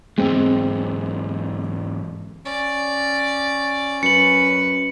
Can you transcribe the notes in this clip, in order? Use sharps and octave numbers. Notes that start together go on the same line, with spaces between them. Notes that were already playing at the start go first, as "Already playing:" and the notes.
E2 G#2 G#3 C4
C#4 D5
F#2 B4 C#7 F#7